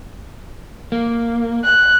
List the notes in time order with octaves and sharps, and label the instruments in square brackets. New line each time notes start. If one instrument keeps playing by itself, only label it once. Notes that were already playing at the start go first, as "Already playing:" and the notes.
[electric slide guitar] A#3
[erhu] F#6